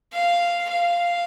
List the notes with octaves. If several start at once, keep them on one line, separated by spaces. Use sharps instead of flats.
F5
F5